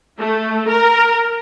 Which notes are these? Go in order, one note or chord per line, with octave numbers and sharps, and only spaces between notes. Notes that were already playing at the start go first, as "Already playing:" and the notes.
A3
A#4